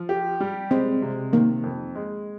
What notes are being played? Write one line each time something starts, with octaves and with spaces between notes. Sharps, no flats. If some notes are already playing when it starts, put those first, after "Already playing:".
Already playing: F3
G4
G3
G#3 C4
C3
D#3 A#3
F2
G#3